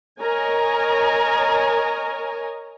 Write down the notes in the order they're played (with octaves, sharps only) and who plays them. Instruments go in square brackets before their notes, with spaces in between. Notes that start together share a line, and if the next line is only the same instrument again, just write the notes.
[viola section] A#4 C#5 D#5 G#5 A#5